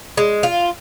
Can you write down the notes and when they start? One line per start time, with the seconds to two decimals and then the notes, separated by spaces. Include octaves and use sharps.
0.17 G#3
0.43 F4